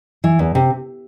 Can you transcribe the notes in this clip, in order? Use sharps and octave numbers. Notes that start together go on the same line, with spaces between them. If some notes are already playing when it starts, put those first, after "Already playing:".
E3
E2
C3